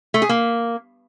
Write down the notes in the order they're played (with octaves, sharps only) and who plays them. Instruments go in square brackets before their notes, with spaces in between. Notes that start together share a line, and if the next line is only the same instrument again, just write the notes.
[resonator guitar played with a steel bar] A3
G#4
A#3